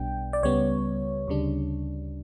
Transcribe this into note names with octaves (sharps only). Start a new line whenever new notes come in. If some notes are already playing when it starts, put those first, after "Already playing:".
Already playing: B1 B2 G3 B3 D4 G5
D5
C#2 C#3 G3 B3 C#5
D2 C#3 G3 D4